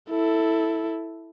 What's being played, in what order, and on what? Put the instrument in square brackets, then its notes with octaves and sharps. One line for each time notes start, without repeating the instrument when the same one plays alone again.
[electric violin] E4 A4